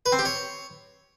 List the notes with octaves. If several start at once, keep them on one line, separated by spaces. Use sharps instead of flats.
B4
C4
G4
C#5